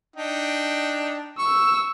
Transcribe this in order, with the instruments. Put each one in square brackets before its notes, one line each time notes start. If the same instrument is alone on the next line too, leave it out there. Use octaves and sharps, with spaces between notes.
[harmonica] D4 D#4 G5
[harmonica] C#6 [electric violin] E6